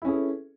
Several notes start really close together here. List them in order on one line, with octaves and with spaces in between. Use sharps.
E4 C#4 G#4 B4 A4